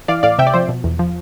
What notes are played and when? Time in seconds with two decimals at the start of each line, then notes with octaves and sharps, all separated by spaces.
0.08 E3 D5 F5
0.23 A2 D5 F5
0.39 C3 E5 G5
0.47 D5
0.54 F3 C5
0.69 B2
0.84 E2
0.99 F3